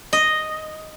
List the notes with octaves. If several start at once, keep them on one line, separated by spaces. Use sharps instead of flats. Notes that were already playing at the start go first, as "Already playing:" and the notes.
D#5